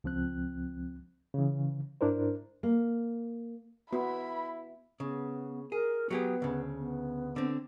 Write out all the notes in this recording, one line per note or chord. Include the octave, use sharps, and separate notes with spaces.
C#2 F3 C4 F#6
C#3 E3
G#2 D4 E4 A#4 C5
A#3
B3 E4 F#4 B5
C#3 B3
G#4 A#4
F#3 B3 G4 G#4
D2 C#3
B3
D3 C4